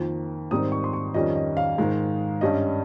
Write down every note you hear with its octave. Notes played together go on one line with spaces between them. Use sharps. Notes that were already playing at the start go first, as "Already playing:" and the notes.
Already playing: F2 D#3 A#3
G#2 D#3 G3 C4 D#4 D#6
C#6
C6
C#6
F2 D#3 G3 C#4 D#5
D#5
F5
G#2 D#3 G#3
G2 G3 C#4 D#5